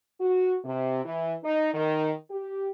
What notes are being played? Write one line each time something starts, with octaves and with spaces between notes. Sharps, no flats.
F#4
C3
E3
D#4
D#3
G4